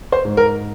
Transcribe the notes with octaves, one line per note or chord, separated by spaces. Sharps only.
C5
G#2
A#4